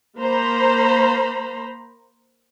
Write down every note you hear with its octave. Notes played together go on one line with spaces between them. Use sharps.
A#3 C5 A#5 B5